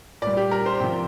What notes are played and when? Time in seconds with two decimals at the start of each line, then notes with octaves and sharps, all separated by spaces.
0.22 A#2 G3 D5
0.37 G4
0.51 A#4
0.66 C5
0.80 C3 F3 G5